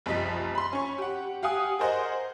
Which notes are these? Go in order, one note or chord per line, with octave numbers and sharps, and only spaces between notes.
F#1 C2 F3 D#5 B6
B5 C6
C#4 C#6
G4 F#5
G4 F5 F#5 G#5 D#6
G#4 A#4 C5 D#5 F#5